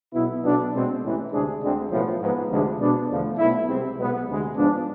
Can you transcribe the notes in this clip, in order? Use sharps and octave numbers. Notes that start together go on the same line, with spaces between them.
B1 B2 B3 E4
B1 B2 B3 D4
B2 G#3 C4
A1 A2 E3
D2 C3 G#3 D4 G#4
D2 D3 G#3 C4
B1 A2 F3 B3 F4
G#2 F3 B3
D2 C3 F3 G#3 D4
B2 B3 D4
E2 D3 F3 A3
B1 B2 A3 E4
C2 C3 G#3 C4
B1 B2 G#3 B3
D2 C3 G#3
G#2 F3 B3 D4